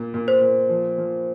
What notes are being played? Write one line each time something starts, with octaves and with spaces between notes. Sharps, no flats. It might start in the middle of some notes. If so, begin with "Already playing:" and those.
Already playing: A#2
A#2
C5
A#2
F3
F3